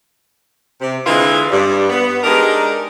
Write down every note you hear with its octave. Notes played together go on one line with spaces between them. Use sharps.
C3
D3 E3 G#3 C4 E4 F4
G2 G3
B3
G#3 D4 D#4 G4 A#4